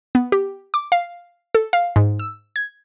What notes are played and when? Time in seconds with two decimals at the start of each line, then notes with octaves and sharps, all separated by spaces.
0.15 B3
0.32 G4
0.74 D6
0.92 F5
1.55 A4
1.73 F5
1.96 G#2
2.19 E6
2.56 G#6